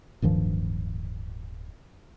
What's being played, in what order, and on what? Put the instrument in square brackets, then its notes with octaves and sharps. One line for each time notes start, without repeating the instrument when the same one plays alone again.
[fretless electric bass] D1 G2 D#3 F3